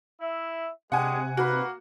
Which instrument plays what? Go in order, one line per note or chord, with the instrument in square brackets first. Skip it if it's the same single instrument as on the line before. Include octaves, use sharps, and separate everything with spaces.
[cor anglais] E4 [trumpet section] E5
[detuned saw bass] C3 [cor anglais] G#3 [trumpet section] D4 G4 G#4 [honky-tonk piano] F#5 G#5
[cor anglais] A#3 [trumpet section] D#4 B4 [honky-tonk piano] F#4